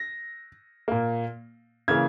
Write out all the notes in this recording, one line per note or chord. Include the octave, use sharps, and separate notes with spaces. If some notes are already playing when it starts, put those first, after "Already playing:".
Already playing: A#6
A#2 A#3
C#3 E3 A#3 G#6